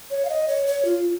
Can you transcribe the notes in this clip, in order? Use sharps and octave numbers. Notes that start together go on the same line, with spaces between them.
C#5
F5
D#5
C#5
C#5
F4